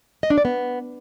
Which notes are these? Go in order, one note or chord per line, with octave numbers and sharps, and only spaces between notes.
D#5
D4
D5
B3